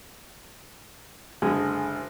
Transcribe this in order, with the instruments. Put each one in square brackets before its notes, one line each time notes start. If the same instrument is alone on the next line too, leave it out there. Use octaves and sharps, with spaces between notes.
[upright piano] F#1 [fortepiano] D3 G#3